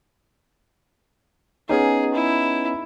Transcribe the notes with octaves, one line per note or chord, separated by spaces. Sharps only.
B3 C#4 D#4 G#4
E4